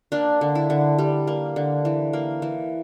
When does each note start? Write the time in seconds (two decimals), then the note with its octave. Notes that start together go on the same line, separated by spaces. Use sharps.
0.12 A#3 D4
0.41 D3
0.55 E4
0.70 D3
0.99 G3
1.27 A#3
1.56 D3
1.85 E3
2.13 A#3
2.42 E3